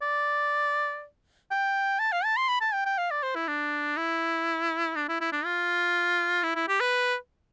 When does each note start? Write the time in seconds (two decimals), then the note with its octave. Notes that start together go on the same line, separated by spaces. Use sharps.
0.02 D5
1.51 G5
1.99 A5
2.12 F5
2.25 A5
2.37 C6
2.49 B5
2.61 A5
2.74 G5
2.86 G5
2.98 F5
3.11 D5
3.23 C5
3.35 E4
3.48 D4
3.97 E4
4.96 D4
5.09 E4
5.21 E4
5.32 D4
5.45 F4
6.43 E4
6.56 E4
6.68 G4
6.80 B4